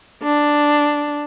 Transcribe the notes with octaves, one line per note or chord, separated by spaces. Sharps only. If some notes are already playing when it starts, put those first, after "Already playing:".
D4